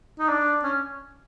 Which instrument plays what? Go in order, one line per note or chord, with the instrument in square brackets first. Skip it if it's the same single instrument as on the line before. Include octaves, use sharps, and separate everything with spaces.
[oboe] D#4
D4
C#4